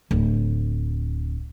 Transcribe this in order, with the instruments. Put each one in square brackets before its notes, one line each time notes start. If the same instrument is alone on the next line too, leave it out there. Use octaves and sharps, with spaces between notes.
[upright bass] D1